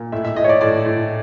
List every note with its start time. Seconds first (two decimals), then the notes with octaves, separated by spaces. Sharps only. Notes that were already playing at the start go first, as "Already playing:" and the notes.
Already playing: A#2
0.12 A2 E5
0.25 E5
0.36 A2 D#5
0.44 C#5
0.49 D5
0.61 A2 D5
0.86 A2